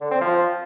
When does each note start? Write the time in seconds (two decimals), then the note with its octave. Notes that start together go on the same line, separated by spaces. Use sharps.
0.01 D3
0.11 C4
0.21 F3